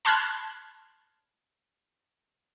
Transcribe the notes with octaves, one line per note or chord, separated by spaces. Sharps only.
A5 B5 C6 F6 F#6 G#6